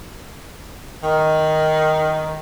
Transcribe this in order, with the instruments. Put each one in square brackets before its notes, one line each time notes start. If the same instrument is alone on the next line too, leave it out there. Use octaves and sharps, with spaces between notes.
[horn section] D#3